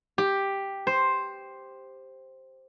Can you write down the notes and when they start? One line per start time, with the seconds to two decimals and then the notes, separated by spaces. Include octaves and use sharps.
0.18 G4
0.87 C5